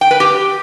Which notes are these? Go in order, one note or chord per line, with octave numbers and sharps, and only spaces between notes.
G5
B4
G4